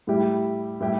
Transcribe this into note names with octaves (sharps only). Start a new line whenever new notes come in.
A2 G3 E4 G4
A2 G3 E4 G4